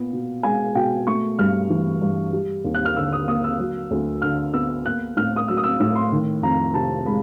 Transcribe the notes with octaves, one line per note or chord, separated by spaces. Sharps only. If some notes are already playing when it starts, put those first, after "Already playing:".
Already playing: A#2 B3
B2
G#3 G#5
B2 G5
A3 C#6
G2 F6
E3
G2
G3
D#2
F#6
F6
D3 E6
D#6
A#3 D#6
E6
F#3
D2
D3 F6
B3 E6
A#3 F#6
A2 F6
D#6
F#3 E6
D#6
E6
A2 E6
C6
D#3
F2 A#5
C3 A5
G#3 B5